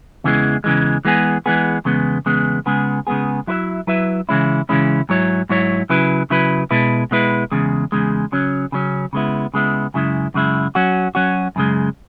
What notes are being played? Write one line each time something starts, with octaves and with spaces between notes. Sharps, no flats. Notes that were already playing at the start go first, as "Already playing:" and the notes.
E2 C#3 E3 G#3
E2 C#3 E3 G#3
E3 G#3 B3 G#4
E3 G#3 B3 G#4
E2 C#3 G#3 B3
E2 C#3 G#3 B3
C#3 G#3 B3 G#4
C#3 G#3 B3 G#4
F#3 E4 B4 E5
F#3 E4 B4 E5
C#3 E3 G#3 C#4 E4
C#3 E3 G#3 C#4 E4
G#2 F#3 E4 C#5
G#2 F#3 E4 C#5
C#3 F#3 E4 B4
C#3 F#3 E4 B4
B2 G#3 E4 B4
B2 G#3 E4 B4
E2 C#3 G#3
E2 C#3 G#3
C#3 F#3 C#4
C#3 F#3 C#4
C#3 G#3 B3 E4
C#3 G#3 B3 E4
F#2 C#3 G#3 E4
F#2 C#3 G#3 E4
F#3 C#4 F#4
F#3 C#4 F#4
F#2 C#3 G#3